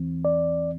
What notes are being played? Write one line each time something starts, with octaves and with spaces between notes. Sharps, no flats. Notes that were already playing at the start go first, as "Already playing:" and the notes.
Already playing: E2 E3 C4
D5